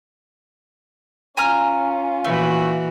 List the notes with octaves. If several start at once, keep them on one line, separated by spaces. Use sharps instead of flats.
C#4 F4 G#5 A#5 F6
A#2 E3 A3 F#4